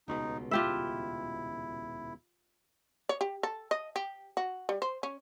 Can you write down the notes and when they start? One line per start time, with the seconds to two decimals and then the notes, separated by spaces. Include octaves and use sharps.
0.08 D#1 C#2 B2 D#4
0.51 E4 F4 G4 E5
3.09 C#5
3.21 G4
3.43 A4
3.71 D#5
3.96 G4
4.37 F#4
4.69 G3
4.82 C5
5.03 C#4